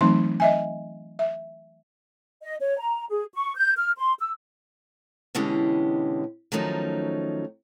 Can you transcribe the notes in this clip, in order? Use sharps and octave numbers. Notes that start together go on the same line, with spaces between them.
E3 F#3 A3 C4 D#4 C6
D#5 E5 G#5
E5
D#5
C#5
A#5
G#4
C#6
G6
F6
C6
E6
B2 D3 E3 G#3 C#4 G4
D#3 F3 F#3 A3 C#4 D#4